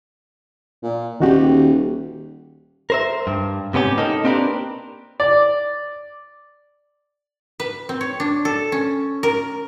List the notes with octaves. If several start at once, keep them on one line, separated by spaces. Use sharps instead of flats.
A#2
D#1 D#3 F#4 G4
A#4 C5 E5
G2
G#2 C3 B3 C#4 G4
A#3 D#4 A4 D#5
A#3 C4 D4 G4 A#4 B4
D5
B4
C4
C#5
D4
A4
C#4
A#4